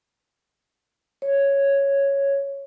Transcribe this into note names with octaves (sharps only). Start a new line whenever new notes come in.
C#5